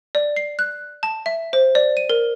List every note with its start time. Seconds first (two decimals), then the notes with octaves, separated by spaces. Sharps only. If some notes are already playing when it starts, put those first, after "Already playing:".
0.15 D5
0.36 C7
0.59 F#6
1.03 A5
1.26 E5
1.53 C5
1.75 D5
1.97 D#7
2.09 A#4